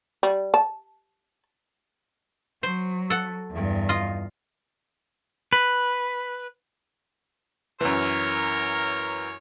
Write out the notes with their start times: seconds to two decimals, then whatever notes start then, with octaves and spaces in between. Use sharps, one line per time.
0.23 G3
0.54 A5
2.63 F#3 C5
3.10 A4 F#5
3.51 E2 G2
3.89 F4 D#5
5.53 B4
7.81 F#2 E3 A#4 C#5